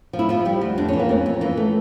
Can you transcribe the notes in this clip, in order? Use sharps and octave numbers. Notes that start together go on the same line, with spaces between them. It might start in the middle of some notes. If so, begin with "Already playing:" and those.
F3
E4
F3 F4
F3 G3
D2
F2 D4
E3 C#4
A#3
F2 C#4
F2
E3 A#3
A3